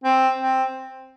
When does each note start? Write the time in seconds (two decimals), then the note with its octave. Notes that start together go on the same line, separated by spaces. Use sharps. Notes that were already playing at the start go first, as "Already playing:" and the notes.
0.04 C4
0.39 C4